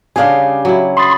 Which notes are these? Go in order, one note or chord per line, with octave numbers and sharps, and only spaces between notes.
C#3 G3 D4 G4 G#4 F5 G#5
F#3 E4
B5 C6 D#6 A6